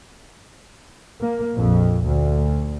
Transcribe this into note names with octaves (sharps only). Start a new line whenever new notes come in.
A#3
A#1 F2
D2